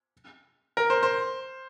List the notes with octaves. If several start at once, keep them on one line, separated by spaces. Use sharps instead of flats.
A#4
C5
C5